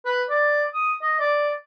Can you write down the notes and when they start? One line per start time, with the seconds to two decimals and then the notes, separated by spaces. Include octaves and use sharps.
0.05 B4
0.30 D5
0.74 D#6
1.02 D#5
1.20 D5